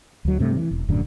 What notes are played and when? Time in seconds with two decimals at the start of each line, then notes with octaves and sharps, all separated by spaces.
0.25 D2 F#3
0.39 G2 C3 A3
0.57 E3
0.71 E1
0.89 D#1 F#2 A2 D3